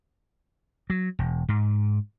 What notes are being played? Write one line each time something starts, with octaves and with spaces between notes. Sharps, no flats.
F#3
E1
G#2